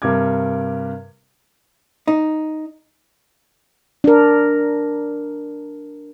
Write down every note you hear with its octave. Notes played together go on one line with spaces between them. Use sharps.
G2 C3 A#4 D6 G#6
D#4
D4 A#4